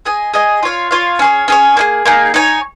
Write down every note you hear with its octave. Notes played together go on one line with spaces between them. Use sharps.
G#4 D#5 G#5
G#4 D#5 G#5
F4 C#5 F5
F4 C#5 F5
C#4 G#4 C#5
C#4 G#4 C#5
A#3 D#4 G#4
A#3 D#4 G#4
D#4 C#5 G#5